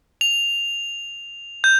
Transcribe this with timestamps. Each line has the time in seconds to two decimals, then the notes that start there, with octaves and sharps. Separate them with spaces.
0.21 F7
1.64 G6